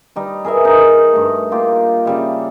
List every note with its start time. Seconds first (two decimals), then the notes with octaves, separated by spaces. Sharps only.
0.16 G3 D#4
0.45 G#4 A#4 B4 E5
0.65 D#4 A#4
1.13 G2 A3
1.51 A#3 F4 G4
2.05 C#3 G3 E5